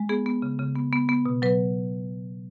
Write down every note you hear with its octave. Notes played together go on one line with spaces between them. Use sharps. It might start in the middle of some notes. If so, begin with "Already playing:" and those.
Already playing: G#3
B3 G#4
B3
C#3
C#3
B3
B3
B3
B2
F#3 B4